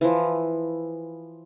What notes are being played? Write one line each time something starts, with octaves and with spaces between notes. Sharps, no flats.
E3 F3